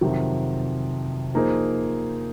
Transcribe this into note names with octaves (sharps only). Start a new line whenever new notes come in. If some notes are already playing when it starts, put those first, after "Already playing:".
F2 C3 D#3 F#3
F3 A#3 D#4 G#4 C5